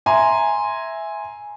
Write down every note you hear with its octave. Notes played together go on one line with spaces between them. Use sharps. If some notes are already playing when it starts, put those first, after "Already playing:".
E5 G#5 A#5 C6